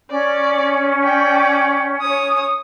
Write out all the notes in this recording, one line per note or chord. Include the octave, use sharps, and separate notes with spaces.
C#4 D5
D5 G5
C#5 D#6